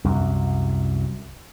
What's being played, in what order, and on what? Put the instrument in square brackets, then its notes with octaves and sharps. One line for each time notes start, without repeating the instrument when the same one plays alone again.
[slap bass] C2 F#2